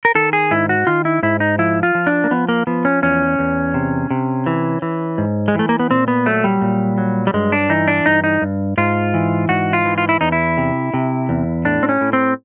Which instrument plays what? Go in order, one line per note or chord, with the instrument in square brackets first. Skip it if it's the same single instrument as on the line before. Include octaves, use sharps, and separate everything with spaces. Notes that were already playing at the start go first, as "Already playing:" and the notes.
[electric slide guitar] A#4
D#3 A4
G#4
G#2 E4
F#4
D#3 F4
E4
G#2 E4
D#4
F3 E4
F4
F3
D4
A#3
F3 B3
A#3
F3 B3
C#4
E2 C#4
E2
C3
C3
E3
E3
G#2
G#3
E3 A3
A#3
B3
A#2 C4
B3
F#3 A3
G3
A#2
F#3
G3
G2 G#3
D4
E3 D#4
D4
G2 D#4
D#4
G2
G#2 F4
E3
G#2 F#4
F4
E3
F4
E4
E2 D#4
E4
C3
C3
E2
A2 D4
C4
C#4
A2
C4